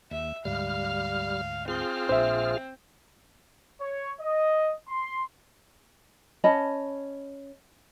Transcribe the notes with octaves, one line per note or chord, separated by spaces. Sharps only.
D#2 E5
D2 G#2 G3 F5 F6
C4 F4 G#4 F6
A#1 A#2 D4 C5 E5
C#5
D#5
C6
C#4 D#5 A5 B5